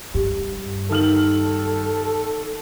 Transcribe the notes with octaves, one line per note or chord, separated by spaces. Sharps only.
G2 G4
D#3 A4 F6 F#7